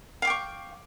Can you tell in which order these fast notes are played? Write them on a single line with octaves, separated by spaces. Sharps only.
F5 D6 G5 C#6